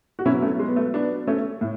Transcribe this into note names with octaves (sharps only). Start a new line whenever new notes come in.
F#4
B2 F#3 C#4 E4
A3 C#4
G#3
B3
A3
B3 D4
A3 C#4
A2